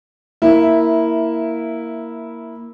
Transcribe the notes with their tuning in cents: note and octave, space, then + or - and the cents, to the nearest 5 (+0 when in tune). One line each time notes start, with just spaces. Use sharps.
A#3 +0 E4 -10 E5 +0